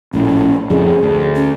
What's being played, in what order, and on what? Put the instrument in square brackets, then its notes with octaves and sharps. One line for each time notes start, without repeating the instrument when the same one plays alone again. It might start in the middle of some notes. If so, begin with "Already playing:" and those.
[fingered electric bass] A#1 A2 [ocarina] C#4
[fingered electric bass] F2 A2 C#3 [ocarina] G#4
[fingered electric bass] D2
[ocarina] C#4